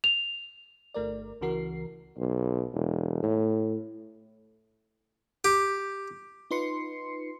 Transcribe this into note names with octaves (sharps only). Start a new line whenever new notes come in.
F7
G1 A3 A#4 D5
C#2 C#3 E3 F#4 A#4 C7
B1
E1
A2
G4
D#4 F4 B4 C6 C7 C#7